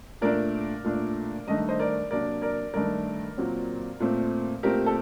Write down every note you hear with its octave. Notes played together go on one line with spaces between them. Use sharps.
A#2 A3 D4 A#4 D5
A#2 A3 D4
G2 D#3 A3 D4 D#5
C5 D#5
A#4 D5
C3 F#3 A#3 D4 A#4 D5
A#4 D5
G2 D#3 A3 D4 A#4 D5
A#2 F#3 C4
A#2 A3 C4
A#2 A3 C4 G4 A#4
A4